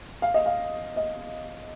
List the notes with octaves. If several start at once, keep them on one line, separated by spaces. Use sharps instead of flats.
F5
D#5
F5
D#5